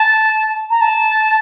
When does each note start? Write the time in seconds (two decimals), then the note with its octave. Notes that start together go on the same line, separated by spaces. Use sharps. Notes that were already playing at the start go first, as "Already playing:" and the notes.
Already playing: A5
0.70 A#5
0.81 A5